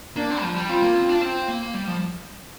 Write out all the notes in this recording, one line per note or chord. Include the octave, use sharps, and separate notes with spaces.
A#3 D4
C4
F3
G3
C4 F4
A#3
C4
D4
C4
A#3
G3
F3